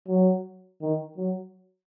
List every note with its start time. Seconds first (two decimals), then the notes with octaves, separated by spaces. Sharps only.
0.08 F#3
0.82 D#3
1.18 F#3